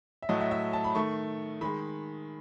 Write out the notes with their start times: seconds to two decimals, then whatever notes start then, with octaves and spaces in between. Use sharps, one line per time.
0.22 E5
0.29 A2 F#3 A3 D#5
0.40 E5
0.51 E5
0.73 A5
0.84 B5
0.95 D#3 A3 C#6
1.61 D#3 G#3 B5